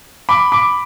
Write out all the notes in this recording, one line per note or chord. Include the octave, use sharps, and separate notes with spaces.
B5 D6
B5 D6